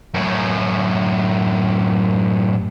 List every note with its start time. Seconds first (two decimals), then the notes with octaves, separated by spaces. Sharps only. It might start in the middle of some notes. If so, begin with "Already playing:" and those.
0.14 F#2 A2